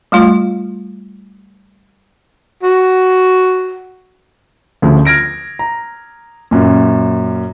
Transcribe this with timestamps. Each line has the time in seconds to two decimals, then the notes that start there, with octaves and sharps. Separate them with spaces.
0.12 G3 A3 F4
2.63 F#4
4.82 D2 C#3 F3
5.05 F6 G#6 A#6 D7
5.59 A#5
6.51 F#2 A#2